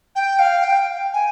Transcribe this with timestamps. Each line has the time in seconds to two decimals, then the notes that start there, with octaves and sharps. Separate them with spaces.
0.15 G5
0.39 F5
0.64 G5
1.13 G#5